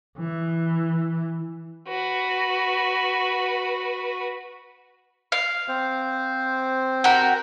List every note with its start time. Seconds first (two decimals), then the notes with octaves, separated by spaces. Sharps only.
0.18 E3
1.88 F#4 B4
5.32 F5
5.68 C4 C5
7.04 F#4 G4 A#4